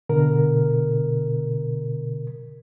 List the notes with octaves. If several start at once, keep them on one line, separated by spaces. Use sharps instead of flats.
B2 D3 A#4